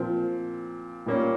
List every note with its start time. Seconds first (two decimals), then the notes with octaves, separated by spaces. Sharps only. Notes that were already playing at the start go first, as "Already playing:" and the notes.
Already playing: A#2 F3 C4
1.06 A#2 G3 A#3 C#4